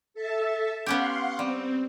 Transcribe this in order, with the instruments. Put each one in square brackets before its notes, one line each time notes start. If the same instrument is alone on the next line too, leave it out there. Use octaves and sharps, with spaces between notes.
[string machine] A4 E5 A5
[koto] B3 C#4 G4 [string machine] F5 F#5 C6
[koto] G3 [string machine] C4